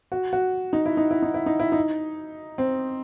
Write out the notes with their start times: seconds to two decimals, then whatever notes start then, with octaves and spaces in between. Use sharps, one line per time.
0.12 F#4
0.33 F#4
0.73 D#4
0.86 E4
0.97 D#4
1.11 E4
1.22 D#4
1.34 E4
1.46 D#4
1.60 E4
1.72 D#4
2.58 C4